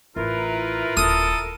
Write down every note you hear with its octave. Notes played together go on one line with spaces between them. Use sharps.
A1 E4 F4 A#4 B4
D#1 A4 D#6